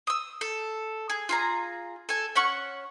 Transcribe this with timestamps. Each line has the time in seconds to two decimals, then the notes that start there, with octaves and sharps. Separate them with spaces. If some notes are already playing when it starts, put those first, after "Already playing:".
0.07 D#6 E6
0.41 A4
1.10 G#4
1.29 F4 G#4 A#5
2.09 A4 G#5
2.36 C#4 F#5 C#6